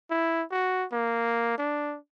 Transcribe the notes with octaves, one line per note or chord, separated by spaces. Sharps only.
E4
F#4
A#3
D4